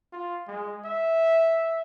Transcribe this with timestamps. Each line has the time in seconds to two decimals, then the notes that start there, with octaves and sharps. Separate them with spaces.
0.12 F4
0.48 G#3
0.85 E5